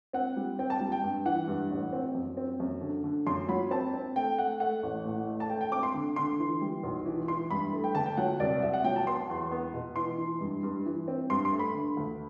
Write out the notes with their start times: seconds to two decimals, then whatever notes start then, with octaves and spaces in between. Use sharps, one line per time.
0.13 C4 F#5
0.36 G3
0.59 C4 G5
0.70 A5
0.80 G3
0.92 G5
1.03 G2
1.25 E3 F#5
1.48 G2
1.70 A1
1.93 C4
2.15 F#2
2.37 C4
2.60 F#2
2.81 D3
3.04 D3
3.27 F#2 C6
3.48 F#3 B5
3.71 C4 A5
3.93 C4
4.16 A3 G5
4.38 A3 F#5
4.60 A3 F#5
4.83 A1
5.05 A2
5.27 A3
5.40 A5
5.50 A3 G5
5.61 G5
5.72 C4 D6
5.83 C6
5.94 D3
6.16 D3 C6
6.39 E3
6.61 G3
6.83 B1
7.06 E3
7.28 E3 C6
7.50 G2 B5
7.73 A3
7.84 G5
7.95 G1 A5
8.06 G5
8.17 F#3 F#5
8.40 C2 D5
8.62 C2 E5
8.74 F#5
8.84 F#3 G5
8.96 A5
9.07 B3 C6
9.29 E2
9.51 B3
9.74 B2
9.96 E3 C6
10.18 E3
10.41 G2
10.63 G2
10.86 E3
11.08 C4
11.30 G2 C6
11.45 C6
11.52 A3
11.59 B5
11.74 D3
11.97 D2